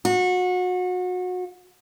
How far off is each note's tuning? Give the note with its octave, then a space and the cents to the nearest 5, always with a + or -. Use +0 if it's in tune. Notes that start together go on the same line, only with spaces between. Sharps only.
F#4 -30